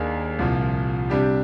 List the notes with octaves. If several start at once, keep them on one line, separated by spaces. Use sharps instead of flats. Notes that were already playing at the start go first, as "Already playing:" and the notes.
Already playing: D#2 D#3 A#3 D4 G#4
C2 A#2 F3
C3 G3 D4 G4